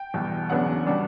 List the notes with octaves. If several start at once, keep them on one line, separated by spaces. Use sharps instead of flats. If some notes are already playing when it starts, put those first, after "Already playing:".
Already playing: G5
E2 B2 G3
E2 C#3 F#3 B3 D4 F#5
B2 G3 D4